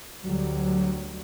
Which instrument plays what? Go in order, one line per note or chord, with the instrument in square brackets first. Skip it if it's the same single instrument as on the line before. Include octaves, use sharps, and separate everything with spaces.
[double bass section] D2 F#3 G3